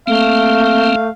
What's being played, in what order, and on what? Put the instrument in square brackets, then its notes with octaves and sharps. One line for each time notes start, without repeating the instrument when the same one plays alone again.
[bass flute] A3 [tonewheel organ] A#3 C4 [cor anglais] F5